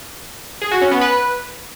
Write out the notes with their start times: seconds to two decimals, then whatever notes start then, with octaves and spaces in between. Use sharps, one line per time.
0.62 G#4
0.71 F#4
0.81 C#4
0.91 B3
1.01 B4